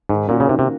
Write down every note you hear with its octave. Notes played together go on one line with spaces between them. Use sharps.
G#2 D#3
A#2 A#3 C#4 F#4
C#3
C3 D#3
C3